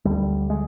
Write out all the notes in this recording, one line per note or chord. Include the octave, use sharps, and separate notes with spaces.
D2 D3 G3
G#3